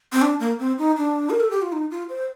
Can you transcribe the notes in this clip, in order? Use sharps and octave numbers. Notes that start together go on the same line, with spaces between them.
C4
D4
A#3
C4
D#4
D4
A#4
A4
G4
F4
D#4
F4
C5